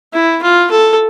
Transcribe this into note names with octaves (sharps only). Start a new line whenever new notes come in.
E4
F4
A4